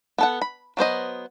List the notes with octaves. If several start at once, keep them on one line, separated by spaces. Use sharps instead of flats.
B3 A4 F#5
B5
F#3 B3 C5 D#5